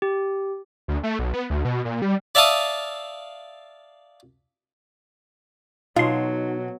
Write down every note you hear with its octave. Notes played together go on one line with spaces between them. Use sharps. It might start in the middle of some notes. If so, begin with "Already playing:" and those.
G4
D2
A3
B1
B3
D2
B2
A#2
G3
D5 E5 F5 A5 D#6
B2 F#3 D#4 F4 C6